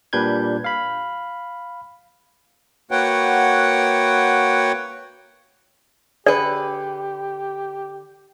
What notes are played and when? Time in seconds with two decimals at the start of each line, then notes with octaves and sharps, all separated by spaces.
0.13 A#2 G3 D4 B4 G6 G#6
0.64 F5 B5
2.91 A#3 F#4 B4 C#5 F#5 G5
6.26 D3 G4 G#4 B4 D5